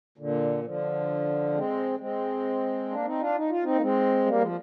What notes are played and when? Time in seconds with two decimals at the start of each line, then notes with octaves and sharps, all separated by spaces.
0.18 A#2 D3
0.64 D3 F3
1.54 G#3 C4
1.99 G#3 C4
2.90 A#3 D4
3.05 C4 D#4
3.20 D4 F4
3.36 D#4
3.50 F4
3.63 C4 D#4
3.75 A#3
3.81 G#3 C4
4.26 G3 A#3
4.41 F3 G#3